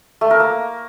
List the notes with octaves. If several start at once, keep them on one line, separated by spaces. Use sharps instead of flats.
A3
A#4
A#3